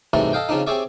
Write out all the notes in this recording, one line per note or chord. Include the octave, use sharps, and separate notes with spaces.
G#2 C3 E3 F#3 G3 A3
A4 D#5 F5 G5
C#3 F3 C4 D4 D#4
C4 G4 G#4 C#5 D5 E5